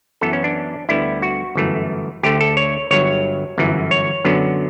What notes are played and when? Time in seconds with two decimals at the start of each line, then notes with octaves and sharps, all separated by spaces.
0.21 F#2 E3 B3 A4
0.33 C#4
0.44 D4
0.89 D2 D3 G3 B3 E4
1.22 F#4
1.55 G1 F#2 E3 A3
2.23 D2 D3 A3 G4
2.41 A4
2.57 C#5
2.91 G1 G2 F#3 C#5
3.58 G1 F#2 E3
3.91 C#5
4.25 F#2 D3 F#3 B3